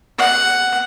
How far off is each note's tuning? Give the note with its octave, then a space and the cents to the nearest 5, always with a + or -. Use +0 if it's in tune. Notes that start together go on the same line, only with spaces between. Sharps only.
F#5 +5